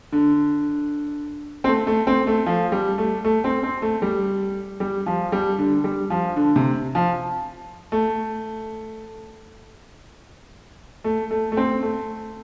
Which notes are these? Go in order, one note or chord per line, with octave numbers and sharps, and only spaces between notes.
D3
C4
A3
A3
C4
A3
F3
G3
A3
A3
C4
C4
A3
G3
G3
F3
G3
D3
G3
F3
D3
C3
F3
A3
A3
A3
A3
C4
A3